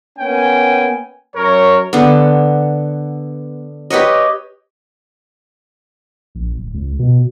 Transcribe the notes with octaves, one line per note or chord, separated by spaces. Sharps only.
A#3 B3 C#4 G5 G#5
F#2 A#4 C#5
D3 B3
G4 B4 C#5 D#5
A#1
D1
C#2
B2